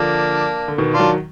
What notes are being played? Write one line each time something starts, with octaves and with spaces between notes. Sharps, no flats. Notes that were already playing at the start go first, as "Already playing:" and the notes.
Already playing: D3 F3 A#3 D4
D3
B2 D#3
D4 F4
D#3 F#3